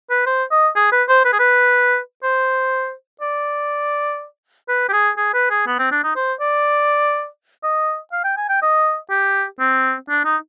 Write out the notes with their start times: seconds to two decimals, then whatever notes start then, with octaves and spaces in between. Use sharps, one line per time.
0.10 B4
0.26 C5
0.51 D#5
0.76 G#4
0.92 B4
1.08 C5
1.25 B4
1.33 G#4
1.39 B4
2.23 C5
3.21 D5
4.69 B4
4.89 G4
4.93 G#4
5.17 G#4
5.34 B4
5.51 G#4
5.67 B3
5.79 C4
5.92 D4
6.04 D#4
6.16 C5
6.40 D5
7.63 D#5
8.12 F5
8.24 G5
8.37 G#5
8.49 G5
8.62 D#5
9.10 G4
9.60 C4
10.09 D4
10.25 D#4